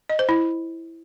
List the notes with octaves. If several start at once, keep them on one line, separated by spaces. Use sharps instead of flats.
D#5
C5
E4